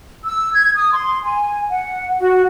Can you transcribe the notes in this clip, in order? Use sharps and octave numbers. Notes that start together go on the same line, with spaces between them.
E6
G#6
D#6
C6
G#5
F#5
F#4